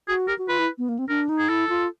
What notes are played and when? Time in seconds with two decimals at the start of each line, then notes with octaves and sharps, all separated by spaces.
0.08 F#4 G#4
0.28 G4 A#4
0.38 F#4
0.48 F4 B4
0.59 E4
0.78 B3
0.89 A#3
0.99 C4
1.08 D4 A#4
1.29 D#4
1.39 G#4
1.49 E4 A4
1.69 F4